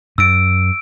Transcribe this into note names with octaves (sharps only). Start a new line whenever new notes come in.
F#2 E6 D7